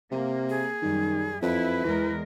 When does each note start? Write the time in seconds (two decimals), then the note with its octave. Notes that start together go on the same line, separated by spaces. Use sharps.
0.12 C3 A#3
0.50 G#4
0.82 F#2 D#3 G3
1.42 F2 E4 B4
1.84 E2 E3 G#3 A#4